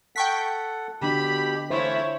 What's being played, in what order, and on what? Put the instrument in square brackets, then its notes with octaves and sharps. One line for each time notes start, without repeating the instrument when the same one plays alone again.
[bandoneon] A4 F#5 [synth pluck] G5 C#6 B6
[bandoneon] B2 G4 [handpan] D3 D4 [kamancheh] B5
[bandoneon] E3 A3 F4 [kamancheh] E4 C#5 [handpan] C5 E5